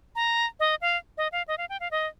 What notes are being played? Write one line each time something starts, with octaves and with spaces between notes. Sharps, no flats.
A#5
D#5
F5
D#5
F5
D#5
F5
G5
F5
D#5